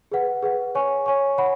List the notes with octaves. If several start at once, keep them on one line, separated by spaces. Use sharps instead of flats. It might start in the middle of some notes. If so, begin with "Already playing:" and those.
G#4 B4 F#5
G#4 B4 F#5
C#5 G#5 C#6
C#5 G#5 C#6
C#5 F#5 B5